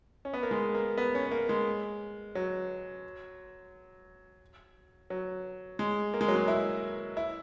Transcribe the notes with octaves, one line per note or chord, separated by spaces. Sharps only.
C#4
B3
A#3
G#3
A#3
B3
C#4
A#3
G#3
F#3
F#3
G#3
A#3
G#3
F#3
G#3
E4
E4